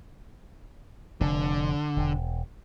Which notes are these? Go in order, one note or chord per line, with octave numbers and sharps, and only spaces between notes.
F1 D3
E1